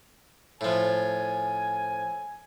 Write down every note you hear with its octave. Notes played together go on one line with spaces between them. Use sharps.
A2 F3 G#5